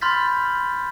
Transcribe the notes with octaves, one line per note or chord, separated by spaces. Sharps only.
B5 C6 F6 G6 A6 B6